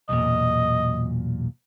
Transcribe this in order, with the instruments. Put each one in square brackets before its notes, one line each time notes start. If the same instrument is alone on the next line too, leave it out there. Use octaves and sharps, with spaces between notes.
[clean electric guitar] B1 E2 A#2 [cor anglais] D#5